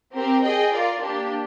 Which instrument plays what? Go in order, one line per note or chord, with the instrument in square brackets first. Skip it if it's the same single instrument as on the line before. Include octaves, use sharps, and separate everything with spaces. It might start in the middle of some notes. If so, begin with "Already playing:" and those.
[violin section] C4 G4 A#4
G#4 D#5 G5
F4 A#4 D5
A#3 D4 G4